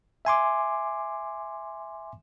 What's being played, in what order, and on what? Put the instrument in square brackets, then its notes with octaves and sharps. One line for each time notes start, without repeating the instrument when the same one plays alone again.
[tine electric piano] E5 G#5 C6 D6